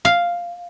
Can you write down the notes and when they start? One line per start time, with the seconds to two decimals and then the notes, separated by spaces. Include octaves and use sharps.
0.05 F5